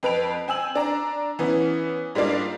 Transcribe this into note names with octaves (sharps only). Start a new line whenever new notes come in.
F2 B4 D7 F7
C4 G#5 E6 F#7
D4 A#5
E3 B3 C#4
G#2 G3 G#3 A#3 D4 F4